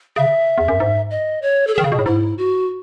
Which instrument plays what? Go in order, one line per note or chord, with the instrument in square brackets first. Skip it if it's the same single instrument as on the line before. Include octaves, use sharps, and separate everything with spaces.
[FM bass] C#3 [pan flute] E5
[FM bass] E2
F#2
G#2
[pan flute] D#5
C#5
A4
[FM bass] D#3 [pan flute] G#4
[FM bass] C#3
B2
A2
[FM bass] G#2 [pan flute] E4
[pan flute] F#4